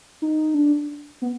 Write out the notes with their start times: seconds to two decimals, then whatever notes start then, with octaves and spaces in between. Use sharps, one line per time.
0.22 D#4
0.54 D4
1.22 B3